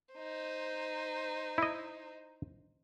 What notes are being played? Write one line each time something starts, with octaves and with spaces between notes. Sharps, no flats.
D#4 C5
E4 D#5